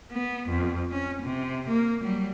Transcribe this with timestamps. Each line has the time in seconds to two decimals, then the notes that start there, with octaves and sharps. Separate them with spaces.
0.11 B3
0.49 F2
0.92 C#4
1.22 C3
1.69 A#3
2.02 F#3 G3